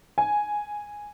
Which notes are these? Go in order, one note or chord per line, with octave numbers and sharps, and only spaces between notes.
G#5